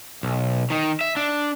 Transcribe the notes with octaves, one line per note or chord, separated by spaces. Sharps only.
B1
D#3 D#4
E5
D4